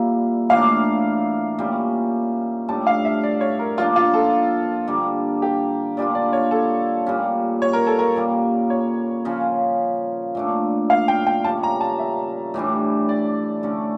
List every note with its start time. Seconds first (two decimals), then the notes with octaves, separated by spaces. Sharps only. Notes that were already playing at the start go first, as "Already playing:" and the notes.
Already playing: A#2 G3 A#3 E4
0.50 A2 E3 A#3 D4 F5
1.59 A#2 G3 C#4
2.68 A2 G3 D4 A5
2.87 F5
3.05 E5
3.23 D5
3.41 C#5
3.59 A#4
3.78 F3 A#3 D4 F4
3.96 F4
4.14 A4
4.88 D3 G3 A#3
5.42 G4
5.97 A#2 G3 D4 F4 D5
6.15 D5
6.33 C#5
6.51 A4
7.07 A#2 G3 C#4
7.62 C#5
7.73 A#4
7.87 A4
7.99 A#4
8.16 A#2 G3 A#3
8.70 C#5
9.25 C#3 F3 C#4
10.35 A#2 A3 D4
10.90 F5
11.08 G5
11.27 G5
11.44 C#3 G3 C#4 A5
11.63 A#5
11.81 A5
11.99 E5
12.54 A2 E3 G3 D4
13.09 D5
13.63 D3 A3 C#4